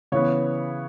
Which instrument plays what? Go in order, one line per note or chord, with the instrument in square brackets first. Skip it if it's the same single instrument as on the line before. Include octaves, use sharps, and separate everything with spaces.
[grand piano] C#3 E3 B3 C#5